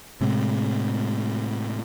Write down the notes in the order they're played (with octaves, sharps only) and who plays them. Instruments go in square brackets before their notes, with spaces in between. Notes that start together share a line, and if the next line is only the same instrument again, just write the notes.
[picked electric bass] A2 C3 G#3